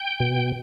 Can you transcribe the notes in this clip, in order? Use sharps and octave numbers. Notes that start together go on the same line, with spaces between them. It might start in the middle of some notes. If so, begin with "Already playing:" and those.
Already playing: G5
B2